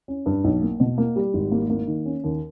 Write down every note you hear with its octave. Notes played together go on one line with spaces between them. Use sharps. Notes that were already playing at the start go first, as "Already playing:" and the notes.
C#4
G2
B1
A#3
B2
A#3
G3
G#1
A#3
A#3
D#3
C#4
D#2